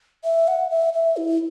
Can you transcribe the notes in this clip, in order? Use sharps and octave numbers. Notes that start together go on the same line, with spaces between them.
E5
F#5
E5
E5
E4